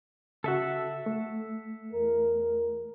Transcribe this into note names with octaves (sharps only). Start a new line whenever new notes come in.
C#3 F#4 A4 E5 F#5
A3
E2 A#4